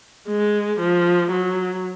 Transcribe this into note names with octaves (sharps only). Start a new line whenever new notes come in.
G#3
F3
F#3